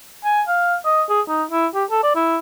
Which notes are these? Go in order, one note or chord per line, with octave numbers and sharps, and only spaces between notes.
G#5
F5
D#5
G#4
D#4
E4
G4
A4
D5
E4